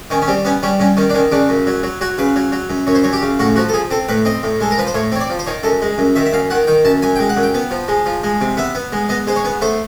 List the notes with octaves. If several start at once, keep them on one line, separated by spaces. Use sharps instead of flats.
D#3 C#4
C#4
G3 C4
B3 C#4
G3 C#4
G2 C#4
D#3 C#4
D4
D#3 C#4
C#3 D4
F#2
F#3
F#3
F#3 F#4
C#3 B4
F#3
F#3
F#2
F#2 C#5
C5
F#2 C#5
G4
C#3
A2 F#4
F3 F#4
A4
F3 G#4
C4 A4
A2 B4
C4 D#5
A2
G#3 A4
A#4
F3 B4
C5
A2 C#5
C4 C#5
D5
F3
C5
D#3 C#5
F#2 A4
G#3
F#2
D#3 E5
E5
F#2 F5
D#3 F#5
D#3 G5
F#2 A5
F#2 G#5
G#3 G5
F#5
F#2
G5
B3
F3
G#3
F3
G#3
C3
B3 E5
B3
G#3
B3 D#5
G#3 C5
C#5
B3
A3 C5